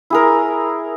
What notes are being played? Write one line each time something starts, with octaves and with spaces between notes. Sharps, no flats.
E4 G#4 A#4